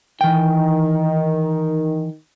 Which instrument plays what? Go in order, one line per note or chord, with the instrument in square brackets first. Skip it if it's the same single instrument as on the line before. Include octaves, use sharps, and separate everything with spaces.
[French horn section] D#3 [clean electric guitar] E3 G5